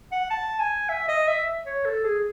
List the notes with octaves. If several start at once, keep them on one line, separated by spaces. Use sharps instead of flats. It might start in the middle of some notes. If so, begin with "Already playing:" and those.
F#5
A5
G#5
E5
D#5
E5
C#5
A4
G#4